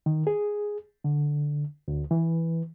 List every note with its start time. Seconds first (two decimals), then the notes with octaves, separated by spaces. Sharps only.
0.06 D#3
0.27 G#4
1.04 D3
1.88 D2
2.11 E3